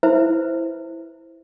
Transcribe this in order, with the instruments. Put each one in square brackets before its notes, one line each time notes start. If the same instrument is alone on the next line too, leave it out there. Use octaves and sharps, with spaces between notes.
[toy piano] E4 B4 C5 E5